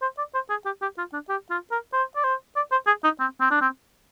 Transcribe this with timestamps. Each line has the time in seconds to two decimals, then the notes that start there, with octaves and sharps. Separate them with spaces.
0.02 C5
0.18 D5
0.34 C5
0.50 G#4
0.66 G4
0.82 G4
0.98 F4
1.13 D4
1.29 G4
1.50 F4
1.72 A#4
1.93 C5
2.16 D5
2.24 C5
2.56 D5
2.72 C5
2.87 G#4
3.04 D#4
3.20 C4
3.41 C4
3.51 D4
3.61 C4